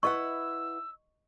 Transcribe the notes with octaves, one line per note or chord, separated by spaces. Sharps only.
E4 B4 D#5 F#5 C#6 E6